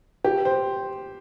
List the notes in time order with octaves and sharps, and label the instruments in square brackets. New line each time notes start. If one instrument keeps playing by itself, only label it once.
[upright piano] G4
C5